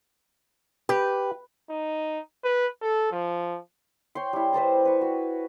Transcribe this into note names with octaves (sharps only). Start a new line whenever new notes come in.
G4 B4
D#4
B4
A4
F3
C#5 G5 C6
G3 E4
B4 C5 A5 A#5
B4 C#6
F#4